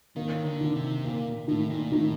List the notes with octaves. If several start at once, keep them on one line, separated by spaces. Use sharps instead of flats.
D#3 A#3
D3
D#3
C3
A#2 A#3
A2 D#3
A#2
A2 D#3